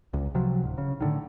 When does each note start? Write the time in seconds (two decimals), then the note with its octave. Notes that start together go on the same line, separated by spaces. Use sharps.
0.13 C#2
0.35 C3 F3 F#3
0.63 D1
0.78 C#3
1.01 A2 D3 D#3